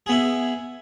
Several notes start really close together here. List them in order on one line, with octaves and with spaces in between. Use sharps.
G#4 B3 E4